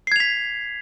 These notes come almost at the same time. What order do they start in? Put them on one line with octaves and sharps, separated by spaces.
C7 G#6 F7 B6